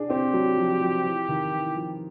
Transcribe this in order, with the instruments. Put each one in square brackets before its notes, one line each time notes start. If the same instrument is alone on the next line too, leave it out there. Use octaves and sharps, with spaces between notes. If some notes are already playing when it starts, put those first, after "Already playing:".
Already playing: [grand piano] D4 G#4
[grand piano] C4 [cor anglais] G4
[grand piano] F#3
F3
F3
E3
D#3
E3
F3